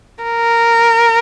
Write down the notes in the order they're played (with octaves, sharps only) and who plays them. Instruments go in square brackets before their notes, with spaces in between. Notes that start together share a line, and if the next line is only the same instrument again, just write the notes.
[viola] A#4